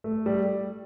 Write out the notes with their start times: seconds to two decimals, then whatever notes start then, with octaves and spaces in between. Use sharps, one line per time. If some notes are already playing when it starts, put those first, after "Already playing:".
0.04 A3
0.26 G3